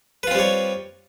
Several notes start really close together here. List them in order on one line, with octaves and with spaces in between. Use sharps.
B4 F4 C4 G3 C#5